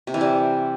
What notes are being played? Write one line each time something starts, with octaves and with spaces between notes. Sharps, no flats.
C3
E3
G3